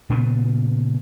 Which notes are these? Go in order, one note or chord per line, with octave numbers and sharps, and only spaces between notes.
A#2 C#3 A3 B3